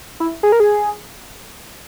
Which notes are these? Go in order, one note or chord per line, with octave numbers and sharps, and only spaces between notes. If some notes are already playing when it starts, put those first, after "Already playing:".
E4
G#4
A#4
G#4